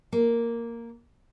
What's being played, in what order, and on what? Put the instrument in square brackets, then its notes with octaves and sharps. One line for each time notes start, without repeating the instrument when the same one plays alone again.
[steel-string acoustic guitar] A#3